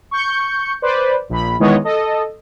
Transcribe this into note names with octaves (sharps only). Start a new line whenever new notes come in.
C#6 G6 C#7
B4 C5 D5
A#1 B5
D#3 E3 G#3 B3 C#5 D#5
A4 D#5